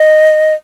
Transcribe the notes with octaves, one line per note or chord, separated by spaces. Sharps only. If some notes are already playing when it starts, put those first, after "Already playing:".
Already playing: D#5